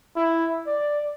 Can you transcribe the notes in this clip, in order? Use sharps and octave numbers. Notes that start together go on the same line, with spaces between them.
E4
D5